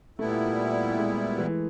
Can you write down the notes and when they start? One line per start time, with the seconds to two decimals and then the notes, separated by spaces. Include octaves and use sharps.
0.19 A#2 G3 A3 B3 E4
0.99 G#3
1.39 E3